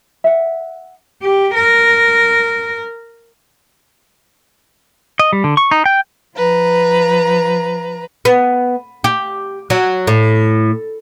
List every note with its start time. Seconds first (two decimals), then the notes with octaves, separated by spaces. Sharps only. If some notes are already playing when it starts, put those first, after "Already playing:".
0.24 E5 F#5
1.22 G4
1.55 A#4
5.19 D#5
5.33 G3
5.44 D3
5.57 C#6
5.71 D#4
5.86 G5
6.36 F3 B4 A#5
8.25 B3
9.04 G4
9.70 F#3
10.07 A2